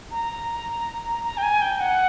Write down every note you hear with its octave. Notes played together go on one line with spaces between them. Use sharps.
A#5
A#5
G5
G#5
G5
F#5